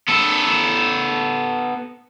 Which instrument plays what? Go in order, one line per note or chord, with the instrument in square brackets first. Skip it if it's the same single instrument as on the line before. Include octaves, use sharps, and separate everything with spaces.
[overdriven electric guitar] B3 A4